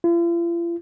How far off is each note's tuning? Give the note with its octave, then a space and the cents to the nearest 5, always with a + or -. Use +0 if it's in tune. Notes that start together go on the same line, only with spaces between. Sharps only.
F4 -45